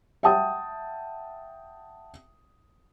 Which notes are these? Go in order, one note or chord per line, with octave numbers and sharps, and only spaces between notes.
E5 F#5 G5 A5 D#6